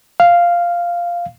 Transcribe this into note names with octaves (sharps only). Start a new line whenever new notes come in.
F5